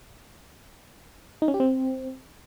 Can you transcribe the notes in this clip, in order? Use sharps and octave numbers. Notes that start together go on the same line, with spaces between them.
D#4
C#4
G4
C4